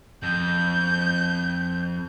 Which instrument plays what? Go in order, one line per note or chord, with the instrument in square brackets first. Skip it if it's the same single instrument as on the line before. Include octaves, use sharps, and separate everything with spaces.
[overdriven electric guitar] F2 [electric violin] G6